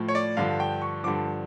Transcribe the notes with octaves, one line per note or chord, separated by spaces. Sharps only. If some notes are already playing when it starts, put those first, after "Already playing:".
Already playing: A2 F3
C#5
D5
G2 D3 F3 F5
G5
C#6
G2 D3 F3 D6